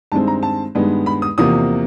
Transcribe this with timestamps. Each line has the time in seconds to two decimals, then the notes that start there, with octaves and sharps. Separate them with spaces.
0.12 G2 D#3 G#3 C4 A5
0.27 A#5
0.43 A5
0.75 G2 D#3 G#3 B3
1.06 B5
1.22 D#6
1.38 E2 C3 F3 A#3 D#6